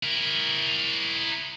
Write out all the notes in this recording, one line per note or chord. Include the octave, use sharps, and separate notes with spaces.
E4 A#4